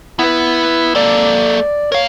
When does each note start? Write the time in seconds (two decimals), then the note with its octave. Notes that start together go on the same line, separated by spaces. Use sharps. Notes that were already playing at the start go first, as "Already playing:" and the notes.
0.19 B3 E4 B4
0.95 A#3 A4 D5
1.92 A#4 C#5 F5